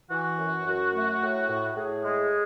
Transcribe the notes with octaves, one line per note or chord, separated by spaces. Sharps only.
E3 F#4
F#2
F#2
A3
A2
A2
A2 G#4
G#3